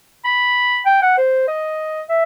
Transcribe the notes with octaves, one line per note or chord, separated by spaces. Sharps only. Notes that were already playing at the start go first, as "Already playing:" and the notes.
B5
G5
F#5
C5
D#5
E5